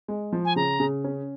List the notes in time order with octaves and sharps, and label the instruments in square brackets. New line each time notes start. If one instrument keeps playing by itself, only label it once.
[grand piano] G#3
F3
[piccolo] G#5
[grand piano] C#3 [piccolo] A#5
[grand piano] C#3
C#4